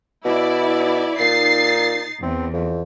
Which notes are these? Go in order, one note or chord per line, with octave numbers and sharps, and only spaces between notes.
B2 E4 D5
A#2 D#4 A6 C7
E2 C4
F2